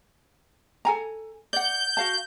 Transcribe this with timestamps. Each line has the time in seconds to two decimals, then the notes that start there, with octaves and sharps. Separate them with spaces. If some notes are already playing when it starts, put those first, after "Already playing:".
0.85 A4 G#5 A#5
1.53 D5 F#5 G6
1.97 F#4 F5 A5